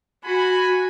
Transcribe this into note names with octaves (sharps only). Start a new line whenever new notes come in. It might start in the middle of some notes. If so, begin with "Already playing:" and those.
F#4 G#5 B5